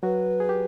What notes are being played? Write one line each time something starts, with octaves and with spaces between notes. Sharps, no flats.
F#3 F#4 B4
G#4
G4